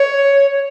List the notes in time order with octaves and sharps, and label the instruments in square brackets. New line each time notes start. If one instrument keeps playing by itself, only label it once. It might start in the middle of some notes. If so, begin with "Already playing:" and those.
Already playing: [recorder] C#5